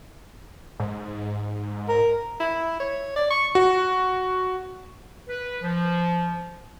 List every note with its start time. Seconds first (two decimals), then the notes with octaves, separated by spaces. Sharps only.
0.80 G#2
1.88 A#4
2.40 E4
2.80 C#5
3.16 D5
3.31 C#6
3.55 F#4
5.28 B4
5.62 F3